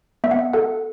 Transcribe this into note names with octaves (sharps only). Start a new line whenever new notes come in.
B3 E5
F#5
E5
A4 F#5